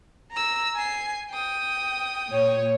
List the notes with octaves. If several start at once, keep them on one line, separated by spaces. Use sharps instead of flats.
A#5 E6
G#5 C7
G5 D#6
A#2 C#5